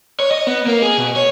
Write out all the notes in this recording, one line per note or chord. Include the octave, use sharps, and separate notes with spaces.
C#5
D#5
B3
A#3
G#4
B2
C#5